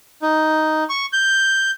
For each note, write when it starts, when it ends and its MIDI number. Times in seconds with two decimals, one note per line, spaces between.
0.22 0.84 63
0.90 1.06 85
1.13 1.71 91